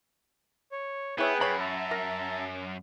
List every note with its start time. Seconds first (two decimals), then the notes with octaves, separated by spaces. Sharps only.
0.72 C#5
1.18 B3 E4 G#4 B4 C#5 E5 G5
1.41 F#2 C#5 B5
1.59 E5 A5 A#5
1.91 A#4